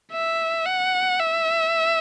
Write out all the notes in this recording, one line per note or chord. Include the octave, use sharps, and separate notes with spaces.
E5
F#5
E5